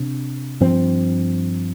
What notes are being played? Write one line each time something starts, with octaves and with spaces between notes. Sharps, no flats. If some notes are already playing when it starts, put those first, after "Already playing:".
Already playing: C3 D4
G2 F3 C4